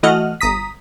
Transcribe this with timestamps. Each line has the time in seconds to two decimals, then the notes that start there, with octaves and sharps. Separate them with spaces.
0.03 E3 A3 F#4 D#5 F#5 F6
0.41 G1 A#5 D#6 B6